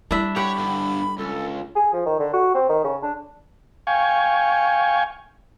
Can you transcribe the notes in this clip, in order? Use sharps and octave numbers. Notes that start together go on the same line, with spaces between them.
G3 D4 E4 E5
G4 C#5 F#5 B5
G2 D3
C#2 A4
G#4
F3
D#3
D3
F#4
C4
D#3
C#3
D4
F5 G5 G#5 C#6